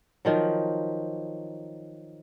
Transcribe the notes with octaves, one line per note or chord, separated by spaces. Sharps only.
D#3 F3 F#3